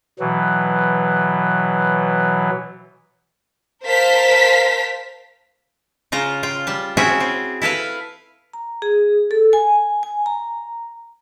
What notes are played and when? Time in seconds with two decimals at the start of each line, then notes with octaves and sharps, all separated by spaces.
0.20 B2 E3 F#3
3.84 A#4 C5 F5 A5 B6
6.12 C#3 F4 A#5
6.43 F4 G5
6.67 G3 A5
6.97 C4 C#4 E4 F#4 G#4 E5
7.20 C4
7.62 E4 A4 B4 F5
8.53 A#5
8.82 G#4
9.31 A4
9.53 G#5
10.03 G#5
10.26 A#5